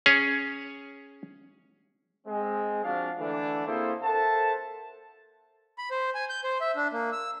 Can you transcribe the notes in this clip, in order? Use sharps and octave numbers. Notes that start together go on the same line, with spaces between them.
C#4 G#4 C#5
G#3 C4
F3 C4 D4 F#4 F5
D3 E3 A3 D4
A#3 C4 E4 G#4 A4 C5
A4 A#4 C5 E5 F#5 A5
B5
C5
G#5
G6
C5
E5
D4
A#3
E6